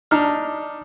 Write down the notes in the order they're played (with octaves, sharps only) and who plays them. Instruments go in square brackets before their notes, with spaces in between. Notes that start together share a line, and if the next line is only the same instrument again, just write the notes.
[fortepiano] D4 D#4 F6